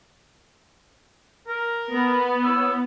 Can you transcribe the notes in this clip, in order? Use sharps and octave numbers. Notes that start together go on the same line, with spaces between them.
A#4
B3
E4 C#5 E6